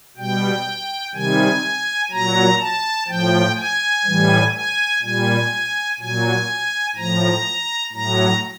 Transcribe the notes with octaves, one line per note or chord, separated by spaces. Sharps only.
B2 G3 G5
C3 D#3 G3 G#5
A#2 F#3 A#5
A5
A2 F3 G5
G#5
A2 E3 G3
G#5
A#2 G3 G#5
A#2 F#3 G#5
A2 F3 A#5
A2 F#3 A#5